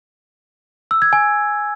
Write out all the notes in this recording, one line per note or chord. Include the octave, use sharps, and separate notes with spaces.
E6
G#6
G#5